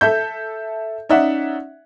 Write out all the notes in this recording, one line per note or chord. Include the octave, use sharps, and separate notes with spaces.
A4 E5 G6
C#4 D#4 D5 E5 F#5